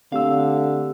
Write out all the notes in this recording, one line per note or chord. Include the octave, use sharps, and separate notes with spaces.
D3 A3 C4 G4 F5 E6